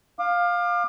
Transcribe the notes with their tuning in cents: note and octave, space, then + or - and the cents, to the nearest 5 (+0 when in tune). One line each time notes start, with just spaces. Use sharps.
F5 +10 D6 +35